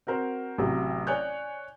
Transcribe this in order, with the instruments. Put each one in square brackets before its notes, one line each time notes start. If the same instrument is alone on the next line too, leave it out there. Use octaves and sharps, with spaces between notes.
[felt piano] C4 F#4 A#4 C5
A1 C3 F#3
C#5 D5 G#5 F#6 G6